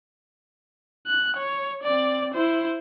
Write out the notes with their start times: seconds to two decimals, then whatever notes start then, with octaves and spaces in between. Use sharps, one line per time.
1.07 F#6
1.36 C#5
1.83 C4 D5
2.34 E4 C5